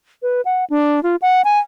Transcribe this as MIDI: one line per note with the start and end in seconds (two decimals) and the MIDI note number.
0.23 0.41 71
0.45 0.65 78
0.70 1.02 62
1.03 1.16 65
1.22 1.42 78
1.45 1.59 80